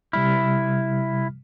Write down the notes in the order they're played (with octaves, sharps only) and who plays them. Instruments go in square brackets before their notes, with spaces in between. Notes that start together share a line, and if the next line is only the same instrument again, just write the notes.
[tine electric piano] C3 G3 F6 [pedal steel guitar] E4